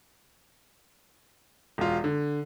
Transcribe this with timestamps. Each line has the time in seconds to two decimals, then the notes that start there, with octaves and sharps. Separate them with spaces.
1.78 E1 F4
2.04 D3